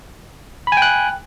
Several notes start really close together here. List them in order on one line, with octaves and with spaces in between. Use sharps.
B5 G#5 G5 F#6